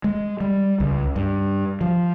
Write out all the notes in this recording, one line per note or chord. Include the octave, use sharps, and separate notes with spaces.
G#3
G3
C#2
G2
F3